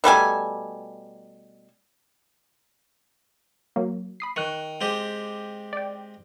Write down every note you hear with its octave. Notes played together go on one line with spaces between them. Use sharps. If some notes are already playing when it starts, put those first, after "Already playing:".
B2 G3 A3 G#5
F#3 A#3
B5 D#6 C7
D#3 C#6 F#6
G#3 C4 G4
D5 G5